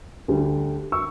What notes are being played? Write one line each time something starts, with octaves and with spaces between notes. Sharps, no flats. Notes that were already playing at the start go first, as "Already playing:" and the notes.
D2 D3 G3
C#6 E6